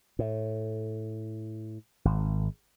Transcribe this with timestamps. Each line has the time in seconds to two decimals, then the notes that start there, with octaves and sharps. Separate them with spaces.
0.19 A2
2.05 G#1